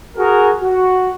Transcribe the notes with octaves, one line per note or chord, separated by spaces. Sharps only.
F#4 G#4 A#4
F#4